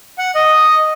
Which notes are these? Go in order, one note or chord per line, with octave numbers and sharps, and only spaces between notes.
F#5
D#5